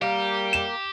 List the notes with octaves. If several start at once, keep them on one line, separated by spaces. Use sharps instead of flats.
G3 A#3 G4
E7